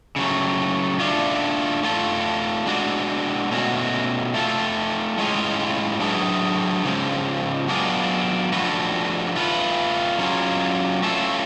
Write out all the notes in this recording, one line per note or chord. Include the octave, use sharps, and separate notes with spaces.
C#3 F#3 A3
A3 D4 F4
A3 F4 A4
G#3 D4 F#4
B2 A3 C#4 F#4
A3 F4 A4
A2 G#3 C#4 F4 G#4
F#3 A3 D4 G#4 B4
C#3 F3 G#3
F#3 B3 D4 F4 G#4
F3 A3 D4 F#4 B4
A3 F4 B4
F#3 C#4 F4 G#4
A3 C#4 F4 A4